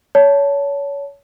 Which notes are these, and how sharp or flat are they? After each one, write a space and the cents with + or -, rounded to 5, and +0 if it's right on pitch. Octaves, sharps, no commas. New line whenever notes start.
C#5 +25 A5 +0